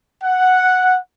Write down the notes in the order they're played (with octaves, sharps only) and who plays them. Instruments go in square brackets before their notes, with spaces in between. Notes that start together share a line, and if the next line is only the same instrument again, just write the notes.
[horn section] F#5